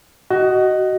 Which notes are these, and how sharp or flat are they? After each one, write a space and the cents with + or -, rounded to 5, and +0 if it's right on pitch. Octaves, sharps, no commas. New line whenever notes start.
F#4 +20 D#5 +0